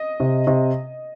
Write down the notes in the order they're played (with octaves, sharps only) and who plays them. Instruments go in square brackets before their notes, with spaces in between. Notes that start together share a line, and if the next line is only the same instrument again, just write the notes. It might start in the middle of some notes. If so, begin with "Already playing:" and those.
Already playing: [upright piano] D#5
[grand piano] C3
C3